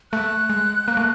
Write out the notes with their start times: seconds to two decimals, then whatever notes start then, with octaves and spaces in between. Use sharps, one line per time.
0.12 A3 F#6
0.49 G#3
0.88 A#3
0.97 A3